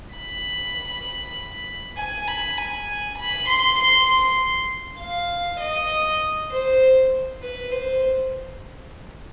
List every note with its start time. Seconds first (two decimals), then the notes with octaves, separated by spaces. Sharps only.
0.16 B5
1.97 G#5
2.28 B5
2.58 G#5
3.18 B5
3.49 C6
3.79 C6
5.00 F5
5.60 D#5
6.51 C5
7.42 B4
7.72 C5